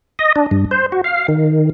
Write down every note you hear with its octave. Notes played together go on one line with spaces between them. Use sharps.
D#5
D4
G2
C5
F#4
F5
D#3